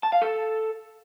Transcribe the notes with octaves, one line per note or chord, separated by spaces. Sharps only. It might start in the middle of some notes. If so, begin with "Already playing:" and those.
A5
F5
A4